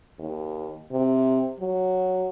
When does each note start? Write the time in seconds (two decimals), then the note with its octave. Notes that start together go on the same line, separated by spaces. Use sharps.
0.19 D#2
0.92 C3
1.60 F#3